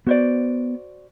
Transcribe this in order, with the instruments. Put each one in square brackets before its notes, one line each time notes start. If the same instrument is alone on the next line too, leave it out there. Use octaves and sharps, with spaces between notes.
[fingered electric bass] B3 [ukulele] F#4 C5 D5